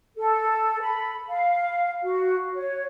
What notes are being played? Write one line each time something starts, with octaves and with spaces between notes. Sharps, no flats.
A4
B5
F5
F#4
C#5